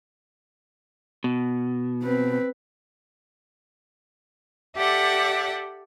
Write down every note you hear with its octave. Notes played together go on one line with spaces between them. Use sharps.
B2
C4 B4
G4 A4 D5 E5 F#5